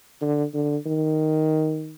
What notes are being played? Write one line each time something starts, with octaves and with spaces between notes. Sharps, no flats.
D3
D3
D#3